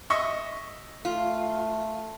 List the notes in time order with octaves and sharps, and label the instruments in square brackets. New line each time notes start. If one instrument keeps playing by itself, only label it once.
[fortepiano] D#5 E5 C#6
[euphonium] A3 [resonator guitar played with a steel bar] F4